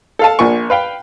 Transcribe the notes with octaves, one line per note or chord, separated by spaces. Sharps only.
A4 F5 A5
A#1 A#2 G#5 C#6
B4 F5 G5